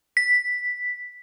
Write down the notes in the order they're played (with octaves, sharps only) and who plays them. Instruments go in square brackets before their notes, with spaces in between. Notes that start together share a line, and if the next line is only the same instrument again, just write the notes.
[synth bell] B6